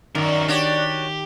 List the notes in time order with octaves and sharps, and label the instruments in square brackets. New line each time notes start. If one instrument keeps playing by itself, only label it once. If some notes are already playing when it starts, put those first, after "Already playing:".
[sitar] F#2 [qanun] D#3 [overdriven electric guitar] F#4 A#4 [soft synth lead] D5
[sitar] D4 F#4 C#5 [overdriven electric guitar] G4